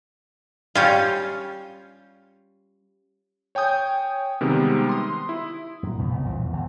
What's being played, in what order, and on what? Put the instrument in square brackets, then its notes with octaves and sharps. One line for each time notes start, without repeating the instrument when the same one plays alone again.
[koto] G3 C#4 F4
[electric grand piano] C#5 G5 G#5 D#6 G6
C3 D#3 G3 G#3 B3 C4
C6 D#6
E4
[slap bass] F#2 A#2
C#2 B2 B3
C2
F2 A#2 E3
E2
G1 C#2 E3